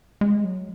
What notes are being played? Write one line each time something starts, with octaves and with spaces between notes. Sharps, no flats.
G#3
F#3